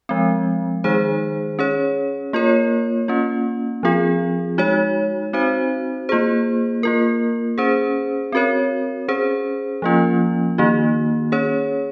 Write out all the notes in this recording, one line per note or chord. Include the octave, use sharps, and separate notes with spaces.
F3 G#3 C4
D#3 G#3 D#4 G#4 C5
C#4 G#4 C#5
A#3 F4 A#4 C#5
A#3 C#4 F4
F3 C4 F4 G#4
G#3 D#4 F#4 C#5
C4 D#4 F#4 C5
A#3 F4 G#4 C5
A#3 F4 A#4
C#4 G#4 C5
C4 F#4 A#4 C#5
C#4 G#4 C5
F3 A#3 C#4 F4
D#3 A#3 D#4 F#4
C#4 G#4 C#5